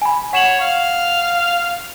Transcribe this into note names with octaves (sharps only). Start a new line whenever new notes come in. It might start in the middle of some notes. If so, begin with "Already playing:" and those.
G#5 B5
C#5 F#5 E7 F#7
F5